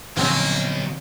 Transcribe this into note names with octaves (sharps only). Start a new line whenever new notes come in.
B1 E2 A#2 D3 F3 A#3 C4 C#4